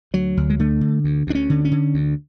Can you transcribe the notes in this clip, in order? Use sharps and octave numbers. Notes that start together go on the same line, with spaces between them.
D2 F#3
D2
G#3
D3 A3
D3
D2
D2 D4
C#4
D3
C#4
D3
D2